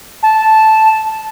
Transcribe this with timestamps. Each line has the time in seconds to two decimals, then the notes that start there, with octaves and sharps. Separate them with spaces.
0.23 A5